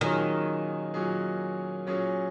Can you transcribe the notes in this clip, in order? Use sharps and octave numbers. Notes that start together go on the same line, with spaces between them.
A#2 D#3 F#3 C#4 G#4
A#2 F#3 C#4 G#4
A#2 F#3 C#4 G#4